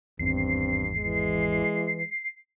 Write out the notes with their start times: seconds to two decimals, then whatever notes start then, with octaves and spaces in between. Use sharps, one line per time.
0.19 G#1 E2 G2 C4 C7
0.97 E3 G#3